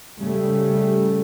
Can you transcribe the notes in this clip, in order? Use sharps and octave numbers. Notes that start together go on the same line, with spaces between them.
C#3 G3 A3